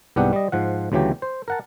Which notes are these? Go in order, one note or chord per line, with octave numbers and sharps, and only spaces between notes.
C2 G#2 B3 D4 G4 F#5
G3 D#5
G#2 F3 F#5
D2 C#3 E3 F#3 G4
C5
A#4 F#5 A5